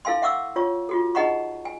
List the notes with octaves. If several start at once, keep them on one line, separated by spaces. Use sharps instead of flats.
E4 A4 F5 G#5 C6
E5 F#5 C#6 D6 E6
F4 C#5 C#6
F4 F#4 A4
D#4 G#4 D#5 F#5 A#5 C#6
G#5